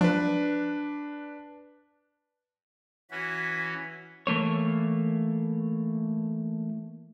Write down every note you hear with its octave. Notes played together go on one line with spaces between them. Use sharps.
F3 D4 B4
E3 C#4 F#4 B6
E3 A3 A#3 C#5